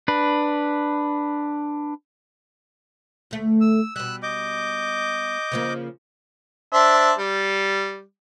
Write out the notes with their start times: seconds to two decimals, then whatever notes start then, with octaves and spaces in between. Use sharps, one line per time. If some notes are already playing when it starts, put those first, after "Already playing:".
0.08 D4 B4
3.31 D2 A3
3.61 E6
3.96 B2 G3 E6 F#6
4.23 D#5 D6 G6
5.52 C#3 F3 A#3
6.73 D4 C5 E5
7.18 G3